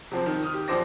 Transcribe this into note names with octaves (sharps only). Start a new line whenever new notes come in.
C3 F3 C4
D#3
D#6 F6
G4
A#1 F3 D4 C5 D6 A#6